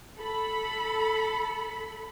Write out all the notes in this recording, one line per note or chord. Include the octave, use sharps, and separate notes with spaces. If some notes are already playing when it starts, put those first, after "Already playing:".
A4 B5